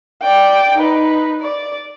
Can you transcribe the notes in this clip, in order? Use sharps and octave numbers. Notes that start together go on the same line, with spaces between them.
D5 G5
D#4 B4
D5